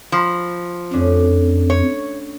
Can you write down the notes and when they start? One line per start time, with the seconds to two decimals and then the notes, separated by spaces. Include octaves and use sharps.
0.12 F3 A#5 B5
0.93 F2 A3 C#4 D4
1.70 C#5